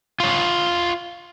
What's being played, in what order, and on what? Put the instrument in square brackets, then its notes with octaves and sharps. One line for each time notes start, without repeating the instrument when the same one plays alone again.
[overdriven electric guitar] F4 C#5